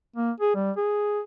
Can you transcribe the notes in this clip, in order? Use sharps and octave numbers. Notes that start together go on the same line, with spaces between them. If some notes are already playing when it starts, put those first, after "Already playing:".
A#3
G#4
G3
G#4